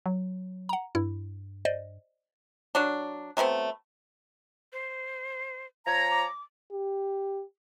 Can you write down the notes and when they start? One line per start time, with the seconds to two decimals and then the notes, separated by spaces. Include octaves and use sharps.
0.06 F#3
0.69 F#5 A#5
0.95 G2 E4
1.65 C5 D5 D#5
2.75 F#3 D4
3.37 F#3 A3 B3 C4
4.73 C5
5.87 F3 C#5 A#5 G#6
6.11 D6
6.71 G4